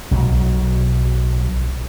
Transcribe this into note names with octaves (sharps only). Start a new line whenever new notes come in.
B1 F#3